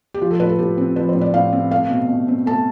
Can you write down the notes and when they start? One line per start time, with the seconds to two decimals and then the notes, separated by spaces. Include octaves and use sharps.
0.14 G4
0.21 F3 F4
0.31 A4
0.40 A2 B4
0.49 A4
0.59 A2 G4
0.78 C4
0.96 F3 B4
1.09 C5
1.15 A2
1.21 D5
1.34 A2 F5
1.53 C4
1.71 A3 F5
1.90 B2
2.09 B2
2.28 C4
2.46 A3 A5